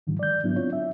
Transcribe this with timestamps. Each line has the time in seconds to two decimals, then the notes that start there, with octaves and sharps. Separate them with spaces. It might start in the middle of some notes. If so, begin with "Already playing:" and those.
0.07 G#2 D3 D#3 F3 G3
0.19 D5 G6
0.43 G#2 F#3 B3 D4 E4
0.56 C4 D4 F4 C#5
0.73 E5